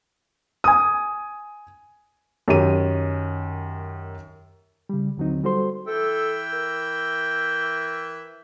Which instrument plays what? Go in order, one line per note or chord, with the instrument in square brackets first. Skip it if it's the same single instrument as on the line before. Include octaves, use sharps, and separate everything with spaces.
[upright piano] G#5 D#6
[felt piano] F#2 D#3 G4 D#7
[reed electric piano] C#3 G3
D#2 D3 F#3 C4 D#4
G3 F#4 A4 C5 C6
[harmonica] E3 E5 G5 [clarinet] A4
[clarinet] A#4